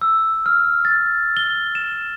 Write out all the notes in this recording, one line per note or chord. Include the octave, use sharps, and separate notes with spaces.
E6
F6
A6
G7
E7